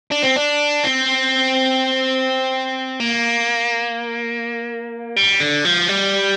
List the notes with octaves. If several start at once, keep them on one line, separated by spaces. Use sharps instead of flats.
D4
C4
D4
C4
A#3
G3
D3
F3
G3